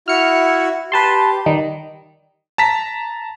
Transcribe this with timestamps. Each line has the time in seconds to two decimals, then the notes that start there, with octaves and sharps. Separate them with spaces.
0.08 E4 F#4 F6 C#7
0.92 G4 B4 A5 C6
1.46 D#3 G3 D#4
2.58 A5 A#5 B6